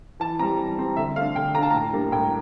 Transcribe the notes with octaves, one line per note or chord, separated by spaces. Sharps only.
E3 A5
G3 C4 A#5
E3
G3 C4
D3 E5
A3 F5
D4
D3 G5
A3 D4 A5 A#5
A2 A#5
G3 A#3 D4
A2 G5